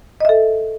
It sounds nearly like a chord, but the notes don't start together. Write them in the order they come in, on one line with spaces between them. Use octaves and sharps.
D#5 E5 A4